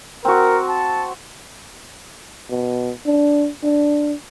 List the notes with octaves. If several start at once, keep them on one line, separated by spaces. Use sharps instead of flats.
C4 F#4 A#4
A5
B2
D4
D4